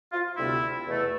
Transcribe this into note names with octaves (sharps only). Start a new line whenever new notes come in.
F4
D2 C3 G3 B3 E4
E2 B2 A3